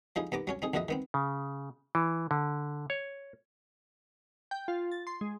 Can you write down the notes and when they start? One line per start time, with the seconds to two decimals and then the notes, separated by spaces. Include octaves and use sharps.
0.16 F3 D#4 E4 G#4
0.32 D#2 B3 A#5 D6
0.47 F#3 C#4 C#5
0.62 C4 D#4 G#4
0.74 A#1 E2 B2 E3 D#5 E5
0.88 D#3 B3 C4
1.14 C#3
1.95 E3
2.31 D3
2.90 C#5
4.51 G5
4.68 F4
4.92 A6
5.07 C6
5.21 G#3